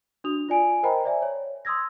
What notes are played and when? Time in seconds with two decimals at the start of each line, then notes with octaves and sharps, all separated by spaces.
0.24 D4 F#4 D#6 F7
0.49 F4 D5 G#5 D7
0.83 A#4 C5 D#5 G5 A#5 B5
1.04 C5 D5 E5 G#5
1.22 C#5
1.65 C6 D#6 E6 G#6 A#6